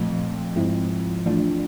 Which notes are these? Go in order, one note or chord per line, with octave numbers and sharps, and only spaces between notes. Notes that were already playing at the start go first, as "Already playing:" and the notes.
Already playing: F2 A#2 F3 A3
G#2 F3 G#3 C4 E4
E3 A3 D4 F4